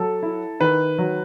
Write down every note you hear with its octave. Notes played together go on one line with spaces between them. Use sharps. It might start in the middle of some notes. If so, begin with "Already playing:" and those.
Already playing: F#3 A4
E4
D#3 B4
F#3